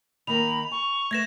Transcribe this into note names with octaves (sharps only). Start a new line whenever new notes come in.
D#3 A#3 A#4 B5 F7
G#5 C#6
A3 B4 G#6 A#6 E7